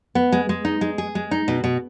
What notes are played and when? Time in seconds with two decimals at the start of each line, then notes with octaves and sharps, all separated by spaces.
0.15 B3
0.32 G#3
0.49 G#3
0.65 D#4
0.81 G#3
0.98 G#4
1.15 G#3
1.31 D#4
1.48 B2
1.64 B2